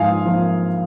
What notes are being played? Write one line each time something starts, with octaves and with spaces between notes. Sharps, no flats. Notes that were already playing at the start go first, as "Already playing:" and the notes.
Already playing: G#2 F3 A#3 F4 F5 G#5 D#6
F3 A#3 F4